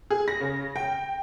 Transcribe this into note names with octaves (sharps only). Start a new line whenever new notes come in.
G#4
A#6
C#3
G5